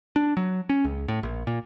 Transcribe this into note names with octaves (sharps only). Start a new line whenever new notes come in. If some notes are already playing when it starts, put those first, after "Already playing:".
D4
F#3
C#4
C#2
A2
A#1
A#2